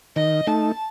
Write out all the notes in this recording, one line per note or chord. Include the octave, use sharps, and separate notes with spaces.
D#3 D#5
A3 D#4 A5